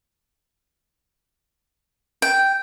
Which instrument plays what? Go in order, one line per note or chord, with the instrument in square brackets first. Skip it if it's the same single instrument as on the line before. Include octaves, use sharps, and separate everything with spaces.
[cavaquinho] G5